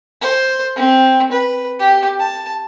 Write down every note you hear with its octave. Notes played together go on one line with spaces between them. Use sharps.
C5
C4
B4
G4
A5